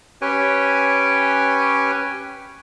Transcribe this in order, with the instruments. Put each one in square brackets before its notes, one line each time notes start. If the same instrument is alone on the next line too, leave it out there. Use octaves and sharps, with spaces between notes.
[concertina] C#4 G4 B4 C#5 G5 G#5